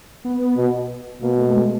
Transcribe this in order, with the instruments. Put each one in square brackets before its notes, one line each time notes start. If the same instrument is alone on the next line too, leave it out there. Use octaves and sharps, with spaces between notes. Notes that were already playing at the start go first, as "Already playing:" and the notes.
[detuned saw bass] B3
[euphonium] B2
[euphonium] B2 [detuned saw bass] A#3
[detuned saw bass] A3
A3
G#3